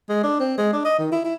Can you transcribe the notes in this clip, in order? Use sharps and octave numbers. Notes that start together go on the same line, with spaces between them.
G#3
D4
C4
G#3
D4
D#5
D#3
E4
E4